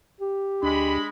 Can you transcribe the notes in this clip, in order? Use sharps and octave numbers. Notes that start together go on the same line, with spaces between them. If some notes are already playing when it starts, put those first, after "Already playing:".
G4
D2 G#3 D4 B5